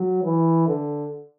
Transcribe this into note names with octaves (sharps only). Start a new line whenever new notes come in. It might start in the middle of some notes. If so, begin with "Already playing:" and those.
Already playing: F#3
E3
D3